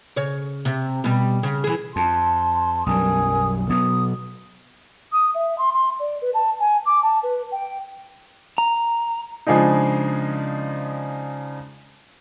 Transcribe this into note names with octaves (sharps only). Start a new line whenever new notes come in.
C#3 C#5
C3
B2 G3
C#3
E3 G#4
F2 A5 C6
B1 F#2 G3 A#4 G#5 D#6
B2 F#3 B3 D#6
D#6
E5
C6
C6
D5
B4
A5
G#5
D6
A5
B4
G5
A#5
C#3 F3 G#3 D4 D#4